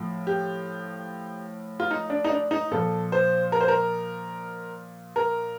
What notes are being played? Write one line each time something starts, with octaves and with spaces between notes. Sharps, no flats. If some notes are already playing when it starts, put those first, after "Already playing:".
Already playing: A2 F3
G4
F4
D#4
D4
D#4
D4
D#4
A#2 F3 A4
C5
A#4
C5
A#4
A#4